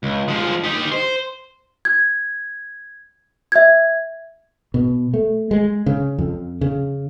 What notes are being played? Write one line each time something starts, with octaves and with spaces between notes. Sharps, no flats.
C#2
F3 G#3
D#4 G4
C5
G#6
E5 G#6
B2
A3
G#3
C#3
F2
C#3